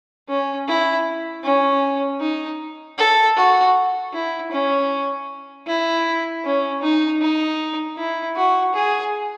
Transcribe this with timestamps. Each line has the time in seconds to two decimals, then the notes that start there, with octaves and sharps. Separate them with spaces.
0.28 C#4
0.67 E4
1.44 C#4
2.20 D#4
2.98 A4
3.37 F#4
4.13 E4
4.51 C#4
5.67 E4
6.45 C#4
6.82 D#4
7.21 D#4
7.97 E4
8.36 F#4
8.74 G#4